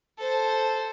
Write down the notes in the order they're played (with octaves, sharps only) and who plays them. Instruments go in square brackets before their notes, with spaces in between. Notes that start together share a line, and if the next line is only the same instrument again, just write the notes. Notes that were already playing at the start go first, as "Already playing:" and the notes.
[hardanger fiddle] A4 C5